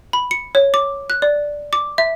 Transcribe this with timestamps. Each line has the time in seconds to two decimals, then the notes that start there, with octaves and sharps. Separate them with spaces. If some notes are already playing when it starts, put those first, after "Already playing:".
0.13 B5
0.31 C#7
0.55 C#5
0.74 D6
1.10 F#6
1.22 D5
1.73 D6
1.98 E5